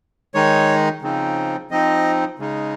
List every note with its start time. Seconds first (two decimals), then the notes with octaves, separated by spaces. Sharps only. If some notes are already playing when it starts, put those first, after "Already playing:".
0.34 D#3 G#3 D#4 C#5
1.02 C#3 F3 C4 D#4
1.71 F3 C4 D#4 D#5
2.39 C#3 G#3 D#4